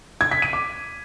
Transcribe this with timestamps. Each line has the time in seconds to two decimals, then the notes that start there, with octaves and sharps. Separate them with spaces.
0.21 G#6
0.31 B6
0.42 D#7
0.53 D6